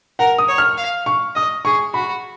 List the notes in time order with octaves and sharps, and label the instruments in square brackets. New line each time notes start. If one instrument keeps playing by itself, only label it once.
[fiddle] A#4 [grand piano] F#5
[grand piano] D#6
[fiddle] C#5
[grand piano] F6
[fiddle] F5
[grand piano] C#6
[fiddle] D#5 [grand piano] D#6
[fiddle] G#4 [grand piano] C#6
[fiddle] F#4 [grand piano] B5